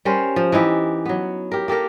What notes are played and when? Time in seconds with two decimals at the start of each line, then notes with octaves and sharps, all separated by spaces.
0.05 G3 C#4 A#4 C5
0.36 F3
0.52 E3 D#4 E4 G4
1.06 F#3 B3
1.52 G4 A#4
1.68 A#3 G4 A4 A#4